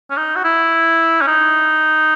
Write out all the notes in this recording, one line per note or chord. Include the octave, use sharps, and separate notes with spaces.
C#4
D#4
F#4
E4
C#4
D#4